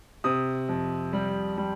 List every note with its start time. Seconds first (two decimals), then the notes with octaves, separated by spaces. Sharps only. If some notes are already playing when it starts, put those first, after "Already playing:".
0.24 C3 D#6
0.69 F2
1.13 G3
1.57 G3